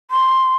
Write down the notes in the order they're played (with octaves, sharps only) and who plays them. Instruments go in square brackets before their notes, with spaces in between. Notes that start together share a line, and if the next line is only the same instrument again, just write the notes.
[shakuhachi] C6